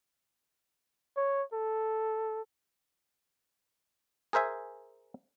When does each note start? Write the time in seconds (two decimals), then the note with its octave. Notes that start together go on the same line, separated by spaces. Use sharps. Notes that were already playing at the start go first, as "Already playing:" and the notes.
1.17 C#5
1.53 A4
4.33 G#4 A#4 C5 E5 G#5